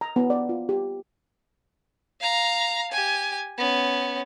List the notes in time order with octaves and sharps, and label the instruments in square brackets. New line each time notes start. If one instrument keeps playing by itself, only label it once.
[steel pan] A#5
B3
D5
F4
G4
[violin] F5 A#5
G4 G#5
B3 C#4